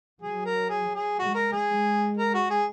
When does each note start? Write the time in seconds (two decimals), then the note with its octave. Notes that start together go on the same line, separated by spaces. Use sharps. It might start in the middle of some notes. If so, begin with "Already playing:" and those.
0.21 F#3 G#4
0.45 A#4
0.70 G#4
0.95 G#4
1.19 G#3 F#4
1.35 A#4
1.52 G#4
1.68 G#3
2.17 A#4
2.34 F#4
2.50 G#4